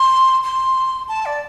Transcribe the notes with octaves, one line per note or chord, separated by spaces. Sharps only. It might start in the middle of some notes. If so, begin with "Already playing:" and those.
Already playing: C6
C6
A5
D5